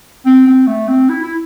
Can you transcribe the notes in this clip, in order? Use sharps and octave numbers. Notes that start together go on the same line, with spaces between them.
C4
C4
A3
C4
E4
E4